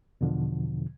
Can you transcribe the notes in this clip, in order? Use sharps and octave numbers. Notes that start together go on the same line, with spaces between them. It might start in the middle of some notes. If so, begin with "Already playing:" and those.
E2 B2 D3 F3